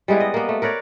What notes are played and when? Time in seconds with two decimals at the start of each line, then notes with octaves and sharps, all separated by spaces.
0.08 G3 G#3 B3 E4
0.20 D#5
0.34 A#3 B3
0.49 A3
0.62 A#4 B4 C#5 D5